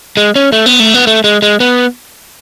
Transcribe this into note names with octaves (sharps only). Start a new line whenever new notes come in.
G#3
C#4
A3
B3
A3
B3
A3
G#3
G#3
B3